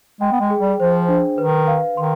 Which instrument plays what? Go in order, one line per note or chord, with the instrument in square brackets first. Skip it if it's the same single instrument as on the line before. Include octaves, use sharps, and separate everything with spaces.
[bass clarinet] G#3 [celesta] G5
[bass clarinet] B3
G#3
[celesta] G#4
[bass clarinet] G3
[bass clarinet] F3 [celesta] C5
[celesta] D4
[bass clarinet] D#3 [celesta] B4
[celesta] F5
[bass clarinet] D#3 [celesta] C6